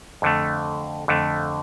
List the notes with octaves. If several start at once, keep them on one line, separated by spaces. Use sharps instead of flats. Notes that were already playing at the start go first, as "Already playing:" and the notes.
F2 D3 A3
F2 D3 A3